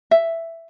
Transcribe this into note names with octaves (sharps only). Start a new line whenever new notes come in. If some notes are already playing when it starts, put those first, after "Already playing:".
E5